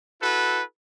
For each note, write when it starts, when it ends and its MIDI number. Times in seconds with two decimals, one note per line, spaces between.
0.22 0.62 64
0.22 0.62 66
0.22 0.62 69
0.22 0.62 71